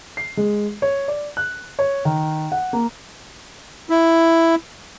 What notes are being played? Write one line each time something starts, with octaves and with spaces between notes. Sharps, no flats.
C7
G#3
C#5
D5
F#6
C#5
D#3
F#5
A#3
E4